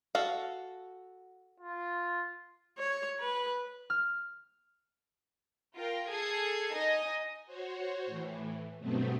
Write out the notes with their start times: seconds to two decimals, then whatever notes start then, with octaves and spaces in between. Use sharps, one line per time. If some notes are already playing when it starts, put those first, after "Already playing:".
0.15 F#4 A4 F5
1.60 F4
2.78 C#5
3.20 B4
3.90 F6
5.74 F4 A#4 G5
6.08 G#4 A4 G#5 G#6 C7
6.72 D#4 D#5 G#5
7.46 F#4 C5 C#5
8.06 A2 E3
8.80 G2 B2 F#3 A3 B3 C4